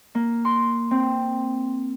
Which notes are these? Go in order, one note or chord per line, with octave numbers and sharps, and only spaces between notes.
A#3
C6
C4